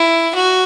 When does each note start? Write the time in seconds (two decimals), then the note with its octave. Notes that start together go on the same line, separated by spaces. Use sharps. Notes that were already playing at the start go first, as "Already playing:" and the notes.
Already playing: E4
0.35 F#4